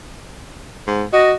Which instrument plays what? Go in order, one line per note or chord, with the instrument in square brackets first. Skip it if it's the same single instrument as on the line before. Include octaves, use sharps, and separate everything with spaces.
[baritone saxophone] G#2
[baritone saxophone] F#4 [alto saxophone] D#5